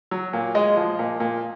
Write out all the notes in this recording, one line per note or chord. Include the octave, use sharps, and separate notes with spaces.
F#3
A#2
G#3 D#5
F3
A#2
A#2